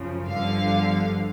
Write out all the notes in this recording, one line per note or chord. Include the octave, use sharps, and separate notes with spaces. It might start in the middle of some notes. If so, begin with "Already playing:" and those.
Already playing: F#2 C#3 F3
G1 G2 D3 F3 F5